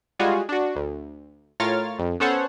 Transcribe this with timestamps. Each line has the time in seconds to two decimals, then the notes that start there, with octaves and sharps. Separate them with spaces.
0.19 G3 G#3 F4 F#4 G#4
0.49 D4 F#4
0.76 D2
1.60 A2 F4 A#4 C#5 F6 A6
1.99 F2
2.20 B3 C#4 A4 C5 C#5 F#5